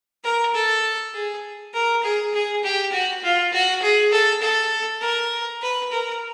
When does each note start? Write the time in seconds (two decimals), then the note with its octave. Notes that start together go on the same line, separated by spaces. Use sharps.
0.24 A#4
0.54 A4
1.14 G#4
1.74 A#4
2.03 G#4
2.34 G#4
2.64 G4
2.92 F#4
3.23 F4
3.53 F#4
3.82 G#4
4.12 A4
4.42 A4
5.01 A#4
5.62 B4
5.91 A#4